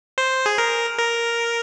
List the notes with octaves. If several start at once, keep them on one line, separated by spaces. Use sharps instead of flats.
C5
G#4
A#4
A#4